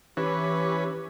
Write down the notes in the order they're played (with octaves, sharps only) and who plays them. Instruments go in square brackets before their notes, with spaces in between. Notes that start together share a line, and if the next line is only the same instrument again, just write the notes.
[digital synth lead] E3 [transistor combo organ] C#4 B4 [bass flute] G4